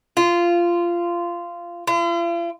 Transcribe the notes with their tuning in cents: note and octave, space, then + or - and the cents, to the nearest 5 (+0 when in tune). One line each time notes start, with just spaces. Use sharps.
F4 -15
F4 -45